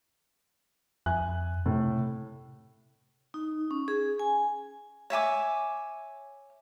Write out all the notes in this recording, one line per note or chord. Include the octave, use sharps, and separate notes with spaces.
F2 E5 G#5 F#6
A2 C3
D#4
C#4
G#4
G#5
C#5 E5 G#5 D6